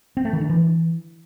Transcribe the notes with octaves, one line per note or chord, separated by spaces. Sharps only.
C4
A3
D#3
D4
E3